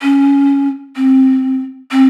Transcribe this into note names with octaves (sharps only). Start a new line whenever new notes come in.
C#4
C4
C4